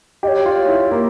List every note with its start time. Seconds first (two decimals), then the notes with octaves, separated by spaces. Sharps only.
0.23 G4 D#5
0.28 C#5
0.46 F4
0.68 E4
0.91 A#3